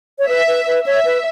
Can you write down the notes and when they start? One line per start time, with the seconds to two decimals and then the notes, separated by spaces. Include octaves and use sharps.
0.19 C#5
0.28 B4 E5
0.47 B4
0.67 B4
0.86 C#5 E5
1.05 B4